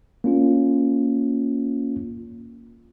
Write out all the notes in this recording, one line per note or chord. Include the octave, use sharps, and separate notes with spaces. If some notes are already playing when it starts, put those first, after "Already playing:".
A#3 C#4 F4